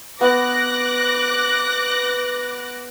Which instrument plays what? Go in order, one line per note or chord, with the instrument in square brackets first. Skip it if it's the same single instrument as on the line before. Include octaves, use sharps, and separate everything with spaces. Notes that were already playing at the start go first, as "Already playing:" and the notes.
[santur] B3 [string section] D6 F#6 A#6